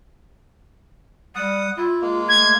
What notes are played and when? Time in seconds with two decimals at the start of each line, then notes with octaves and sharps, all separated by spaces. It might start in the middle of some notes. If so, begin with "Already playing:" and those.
1.35 G3 F#5 D#6
1.77 E4 F4
2.01 G#3 A#3
2.28 A3 G#6